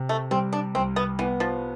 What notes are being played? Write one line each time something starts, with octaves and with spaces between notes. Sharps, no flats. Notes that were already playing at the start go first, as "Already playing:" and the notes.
Already playing: C3
A3
G3 C4
D4
C2 C4
B3
E3 B3
F3